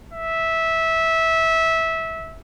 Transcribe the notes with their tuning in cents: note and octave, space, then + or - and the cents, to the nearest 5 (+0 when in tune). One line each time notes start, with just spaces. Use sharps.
E5 -15